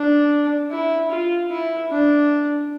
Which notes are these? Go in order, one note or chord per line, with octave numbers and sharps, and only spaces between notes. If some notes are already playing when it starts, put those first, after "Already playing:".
Already playing: D4
E4
F4
E4
D4